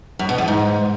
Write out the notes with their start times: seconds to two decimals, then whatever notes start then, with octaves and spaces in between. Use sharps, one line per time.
0.19 F#2
0.29 B2
0.38 E2
0.48 G#2